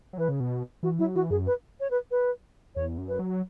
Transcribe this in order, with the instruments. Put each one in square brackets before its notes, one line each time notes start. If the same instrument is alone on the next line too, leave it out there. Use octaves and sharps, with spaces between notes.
[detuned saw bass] F#3
[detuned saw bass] E3 [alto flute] B4
[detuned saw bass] C#3
B2
[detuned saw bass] E3 [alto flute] F#4
[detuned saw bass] F#3 [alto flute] E4
[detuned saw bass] E3 [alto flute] F#4
[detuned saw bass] F#2 [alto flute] G#4
[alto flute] B4
C#5
B4
B4
[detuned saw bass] E2 [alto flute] C#5
[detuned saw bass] F#2
[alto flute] B4
[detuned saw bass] F#3